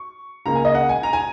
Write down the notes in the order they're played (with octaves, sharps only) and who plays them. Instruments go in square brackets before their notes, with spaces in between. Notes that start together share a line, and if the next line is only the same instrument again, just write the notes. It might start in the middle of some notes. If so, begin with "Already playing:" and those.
Already playing: [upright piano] C#6
C#2 C#3 A#3 A#5
G#5
D#5
F#5
G#5
A#5
G#5